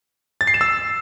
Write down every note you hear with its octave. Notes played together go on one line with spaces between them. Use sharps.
A6
C7
E7
E6